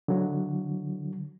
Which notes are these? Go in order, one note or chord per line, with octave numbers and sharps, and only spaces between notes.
D3 F#3